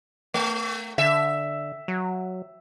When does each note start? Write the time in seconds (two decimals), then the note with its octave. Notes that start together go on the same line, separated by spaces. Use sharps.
0.34 A3
0.98 D3 E5
1.88 F#3